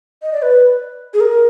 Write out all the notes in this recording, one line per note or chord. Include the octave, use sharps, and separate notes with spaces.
D#5
D5
B4
G#4
A#4